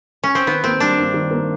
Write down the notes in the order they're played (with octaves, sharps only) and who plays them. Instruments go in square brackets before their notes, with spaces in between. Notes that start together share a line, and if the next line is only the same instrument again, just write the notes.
[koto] C#4
C4
[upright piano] D#3 [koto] B3
[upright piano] A#3 [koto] C4
[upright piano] G3 [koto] D4
[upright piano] G2
D#3
A#3